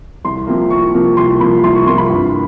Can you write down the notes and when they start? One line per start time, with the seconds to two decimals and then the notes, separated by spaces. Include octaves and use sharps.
0.25 C2 C6
0.47 C3 F3 A#3
0.70 C2 C#6
0.94 C3 F3 A#3
1.17 C2 C6
1.40 C3 F3 A#3 B5
1.63 C2 C6
1.75 C#6
1.87 C3 F3 A#3 C6
1.98 B5
2.10 G2